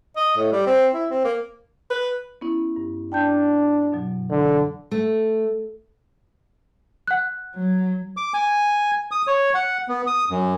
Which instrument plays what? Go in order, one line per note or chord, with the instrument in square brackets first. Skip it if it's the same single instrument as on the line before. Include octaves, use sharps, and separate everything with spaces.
[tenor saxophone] D#5
A2
G3
C4
E4
C4
A#3
[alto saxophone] B4
[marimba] B3 C#4 E4
G2
[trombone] D4 [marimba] G5 A5 G6
[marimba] F#2 B2 F#3
[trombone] D3 [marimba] E3
[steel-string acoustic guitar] A3
[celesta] F#5 F#6
[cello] F#3
[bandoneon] D6
G#5
D#6
C#5
F#5
B3
D#6
F#2